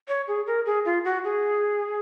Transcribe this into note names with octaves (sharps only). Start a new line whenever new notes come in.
C#5
G#4
A#4
G#4
F4
F#4
G#4